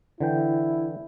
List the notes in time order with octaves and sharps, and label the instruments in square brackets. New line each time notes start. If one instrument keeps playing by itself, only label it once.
[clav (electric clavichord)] D3 E3 G5 [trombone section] E4